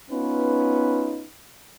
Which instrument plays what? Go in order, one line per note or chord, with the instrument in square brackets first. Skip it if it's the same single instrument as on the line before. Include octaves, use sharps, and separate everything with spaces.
[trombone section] B3 C#4 D#4 F4 B4